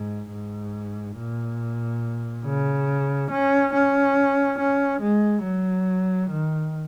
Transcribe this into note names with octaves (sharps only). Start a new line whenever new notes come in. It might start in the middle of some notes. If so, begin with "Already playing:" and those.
Already playing: G#2
G#2
A#2
C#3
C#4
C#4
C#4
G#3
F#3
D#3